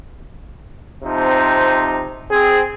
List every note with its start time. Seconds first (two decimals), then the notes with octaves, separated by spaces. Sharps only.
1.04 C3 F3 C4 D#4
2.31 C4 G#4